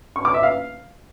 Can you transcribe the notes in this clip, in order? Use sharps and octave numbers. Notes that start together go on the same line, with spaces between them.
C#6
D6
E5
F5